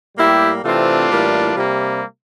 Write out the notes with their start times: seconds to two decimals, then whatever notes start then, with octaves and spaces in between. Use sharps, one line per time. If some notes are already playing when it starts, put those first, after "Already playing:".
0.17 A2 G3 A#3 E4 G4
0.63 C3 E3 A3 C4 D4 F4
1.10 A2 E3 G3 A#3
1.55 C3 G3 A#3